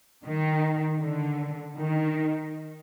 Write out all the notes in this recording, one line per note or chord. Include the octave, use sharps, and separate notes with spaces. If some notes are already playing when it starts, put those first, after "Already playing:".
D#3
D3
D#3